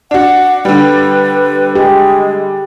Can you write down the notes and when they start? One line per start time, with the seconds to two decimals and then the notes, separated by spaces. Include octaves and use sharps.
0.11 D4 F#4 F#5
0.65 D3 G3 B4
1.75 G#3 G4 G#4